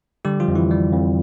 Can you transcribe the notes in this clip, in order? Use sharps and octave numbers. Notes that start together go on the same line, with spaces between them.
D3 G3 G4
F3 F4
F2
E3 E4
G3
F2